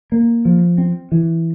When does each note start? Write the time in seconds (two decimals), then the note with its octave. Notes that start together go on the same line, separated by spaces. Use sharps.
0.12 A#3
0.45 F3
0.78 C4
1.12 E3